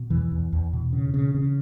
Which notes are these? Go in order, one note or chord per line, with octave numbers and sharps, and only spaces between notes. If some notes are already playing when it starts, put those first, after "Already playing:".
Already playing: B2
E2 E3
E2
E2
B2
C#3
C#3
C#3